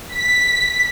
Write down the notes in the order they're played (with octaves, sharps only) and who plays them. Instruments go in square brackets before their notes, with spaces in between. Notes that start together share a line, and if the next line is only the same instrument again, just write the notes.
[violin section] B6